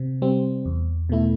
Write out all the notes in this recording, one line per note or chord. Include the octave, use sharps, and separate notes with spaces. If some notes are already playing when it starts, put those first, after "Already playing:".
Already playing: C3 C4
G3 C4
E2
B2 A3 E4